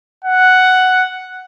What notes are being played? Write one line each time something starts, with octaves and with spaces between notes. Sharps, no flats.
F#5